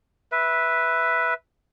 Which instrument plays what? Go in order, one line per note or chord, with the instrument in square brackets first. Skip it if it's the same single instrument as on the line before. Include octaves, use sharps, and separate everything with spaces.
[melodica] B4 E5